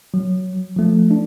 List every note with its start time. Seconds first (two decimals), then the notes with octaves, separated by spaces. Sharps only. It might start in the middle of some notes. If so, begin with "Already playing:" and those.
0.14 F#3
0.76 F3 A3
1.11 D4